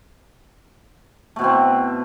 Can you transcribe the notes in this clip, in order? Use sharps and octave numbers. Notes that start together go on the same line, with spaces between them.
B2 A3 C4 E4